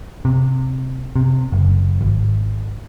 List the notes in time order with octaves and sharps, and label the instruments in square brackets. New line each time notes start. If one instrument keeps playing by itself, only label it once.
[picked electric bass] C3
C3
F#1
G#1